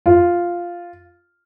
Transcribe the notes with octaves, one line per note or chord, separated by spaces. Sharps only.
F4